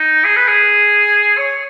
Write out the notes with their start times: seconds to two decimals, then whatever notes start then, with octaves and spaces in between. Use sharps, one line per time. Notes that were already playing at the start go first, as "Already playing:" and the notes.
Already playing: D#4
0.25 G#4
0.36 B4
0.48 G#4
1.37 C#5